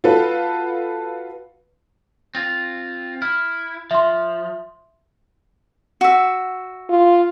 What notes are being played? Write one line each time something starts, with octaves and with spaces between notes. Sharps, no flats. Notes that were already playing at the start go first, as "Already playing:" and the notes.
F4 F#4 A4 B4
C4 F4
E4 F6
F3 E5 C6
F#4 E5
F4